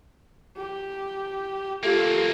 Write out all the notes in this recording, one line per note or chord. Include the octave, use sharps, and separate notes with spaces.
G4
A3 A#3 C4 F4 G4